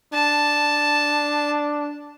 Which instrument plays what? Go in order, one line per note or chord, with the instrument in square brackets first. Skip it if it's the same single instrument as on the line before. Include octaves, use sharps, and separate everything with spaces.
[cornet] D4 [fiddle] A5